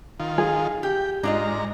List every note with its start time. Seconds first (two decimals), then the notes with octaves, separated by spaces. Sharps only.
0.20 D#3 F4
0.38 G#4
0.83 G4 G5
1.23 G#2 D4 F4 D#5 A#5